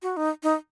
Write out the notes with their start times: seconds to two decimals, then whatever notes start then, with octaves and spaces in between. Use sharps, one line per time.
0.02 F#4
0.17 D#4
0.43 D#4